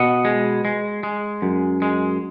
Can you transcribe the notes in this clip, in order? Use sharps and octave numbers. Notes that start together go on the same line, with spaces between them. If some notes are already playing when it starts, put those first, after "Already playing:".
Already playing: B2 D#5 F#5
G#3
G#3
G#3
F#2
G#3